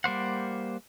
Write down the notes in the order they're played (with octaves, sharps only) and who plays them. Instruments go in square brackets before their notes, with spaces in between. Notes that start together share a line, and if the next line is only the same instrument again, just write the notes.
[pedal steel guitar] G3 A#3 C5 F#5